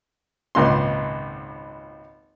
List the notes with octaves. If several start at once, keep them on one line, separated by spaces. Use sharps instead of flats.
G#1 C#2 A#2 C6